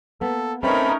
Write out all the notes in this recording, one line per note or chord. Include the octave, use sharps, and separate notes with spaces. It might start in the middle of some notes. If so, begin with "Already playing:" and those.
A#3 B3 A4
A3 C4 C#4 D#4 A#4 B4 B5